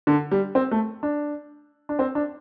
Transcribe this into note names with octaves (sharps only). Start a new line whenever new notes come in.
D3
G3
C4
A3
D4
D4
C4
D4